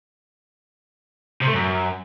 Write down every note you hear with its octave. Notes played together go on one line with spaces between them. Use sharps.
C3
A3
F#2